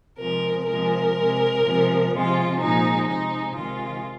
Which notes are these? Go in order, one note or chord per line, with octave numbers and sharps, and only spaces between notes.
C3 F3 G#3 A#4
C3 F3 G#3 A#4
C3 G#3
C3 F3 G#3
C3 F3 G#3 F4
A#2 F3 G#3 D#4
C3 G#3 D#4
C3 D#3 G#3 F4